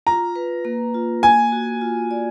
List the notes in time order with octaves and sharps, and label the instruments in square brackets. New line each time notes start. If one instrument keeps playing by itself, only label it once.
[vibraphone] F4 [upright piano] A#5
[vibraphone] B4
A#3
F4
[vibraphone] A#3 [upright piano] G#5
[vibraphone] F#4
F4
D5